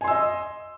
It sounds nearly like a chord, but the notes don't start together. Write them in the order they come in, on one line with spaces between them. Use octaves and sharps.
G#5 C6 E6 D#5